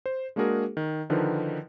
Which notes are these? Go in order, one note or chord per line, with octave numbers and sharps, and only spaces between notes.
C5
G#3 A#3 D4 F#4 G#4 A#4
D#3
D3 D#3 F3 D#4 E4 B4